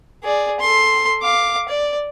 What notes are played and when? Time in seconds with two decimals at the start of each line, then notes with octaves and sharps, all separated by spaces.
0.23 G#4 D5
0.60 A4 C6
1.22 F5 D6
1.68 D5